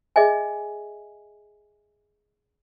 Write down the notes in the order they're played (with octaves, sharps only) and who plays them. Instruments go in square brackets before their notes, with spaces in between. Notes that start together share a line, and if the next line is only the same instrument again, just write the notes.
[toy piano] G#4 D#5 E5 G#5